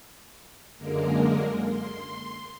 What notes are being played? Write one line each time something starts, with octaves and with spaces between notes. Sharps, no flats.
F#2 D3 G#3 A#3 A#4
C6